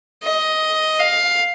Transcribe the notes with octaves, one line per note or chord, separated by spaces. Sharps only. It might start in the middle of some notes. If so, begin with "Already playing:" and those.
D#5
F5